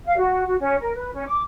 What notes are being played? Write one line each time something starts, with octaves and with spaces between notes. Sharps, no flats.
F5
F#4
F#4
C#4
A#4
B4
C#4
D6